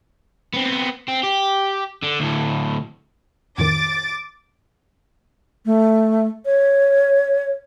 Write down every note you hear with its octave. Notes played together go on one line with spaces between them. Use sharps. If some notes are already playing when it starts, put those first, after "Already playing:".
B3 C4
C4
G4
D3
D2 A2
F2 A2 D#3 D6 A6
A3
C#5